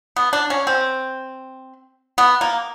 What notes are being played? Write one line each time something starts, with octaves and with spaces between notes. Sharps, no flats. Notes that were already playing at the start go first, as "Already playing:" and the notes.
B3
D4
C#4
C4
B3
A#3